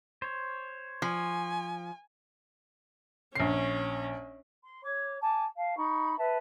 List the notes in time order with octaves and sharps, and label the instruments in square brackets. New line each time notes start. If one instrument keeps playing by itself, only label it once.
[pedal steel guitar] C5 C#5
[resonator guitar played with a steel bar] F3 [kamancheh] G#5
[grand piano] A#1 C7 [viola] C#4
[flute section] C6
C#5 D6
G#5 A5 D6
F5 A5
D#4 B5 C#6
B4 E5 A5